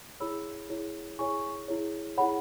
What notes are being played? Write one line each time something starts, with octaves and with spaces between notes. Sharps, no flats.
E4 G#4 C#5 B5 E6
E4 G#4 C#5
E4 G#4 C#5 G#5 C#6
E4 G#4 C#5
E4 G#4 C#5 F#5 B5